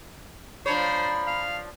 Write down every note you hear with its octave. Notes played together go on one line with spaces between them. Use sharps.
F3 D4 C5 C#5 A#5 B5
F5